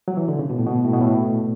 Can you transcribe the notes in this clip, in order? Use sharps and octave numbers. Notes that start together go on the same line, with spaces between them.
F#3
E3
D3
C#3
B2
A2
B2
A2
B2
A2